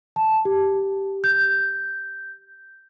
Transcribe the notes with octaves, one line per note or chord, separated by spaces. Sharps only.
A5
G4
G6